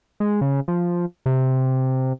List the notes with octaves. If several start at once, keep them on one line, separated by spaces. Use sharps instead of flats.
G#3
C#3
F3
C3